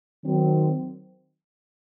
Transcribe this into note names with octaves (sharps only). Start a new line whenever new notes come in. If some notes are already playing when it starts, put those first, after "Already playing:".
D#3 F#3 C4